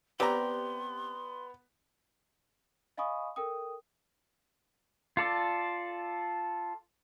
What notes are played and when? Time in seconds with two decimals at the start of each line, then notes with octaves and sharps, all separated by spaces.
0.20 C3 B3 G4 D5 A#5 C6
2.97 D#5 F5 G#5 B5 C#6 D#6
3.36 A4 A#4 G5 D#6
5.17 F4 A4 D5